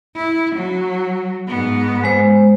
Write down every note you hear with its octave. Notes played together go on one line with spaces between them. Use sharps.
E4
F#3
G#2 B3
G#3 C5